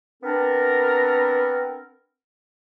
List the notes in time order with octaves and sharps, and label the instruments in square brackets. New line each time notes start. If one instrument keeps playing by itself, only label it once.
[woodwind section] B3 C4 D4 A#4